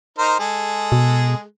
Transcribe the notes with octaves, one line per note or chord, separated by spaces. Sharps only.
D#4 A#4 C5
G#3 G#4 A4
B2